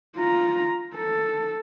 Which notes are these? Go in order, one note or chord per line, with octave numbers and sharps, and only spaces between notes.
F4 A#5
A4